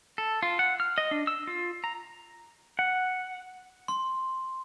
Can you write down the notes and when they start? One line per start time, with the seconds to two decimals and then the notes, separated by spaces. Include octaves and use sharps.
0.18 A4
0.43 F4
0.59 F#5
0.80 F6
0.98 D#5
1.11 D4
1.27 E6
1.47 F4
1.84 A#5
2.79 F#5
3.88 C6